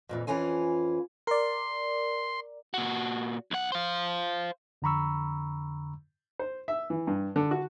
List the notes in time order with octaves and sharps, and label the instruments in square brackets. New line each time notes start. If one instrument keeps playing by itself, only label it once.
[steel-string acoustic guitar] F2 A#2 E3
F2 E3 C#4 F4 G#5
[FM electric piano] A#4 D5 [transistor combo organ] C6
[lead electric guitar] A#2 F#4
B1 F#5
C5 F5
[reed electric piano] F2 D3 A#5 B5 C#6 E6
[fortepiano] C5
E5
E3
G2
D3
F#4